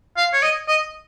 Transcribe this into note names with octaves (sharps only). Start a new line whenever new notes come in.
F5
C#5
D#5
D#5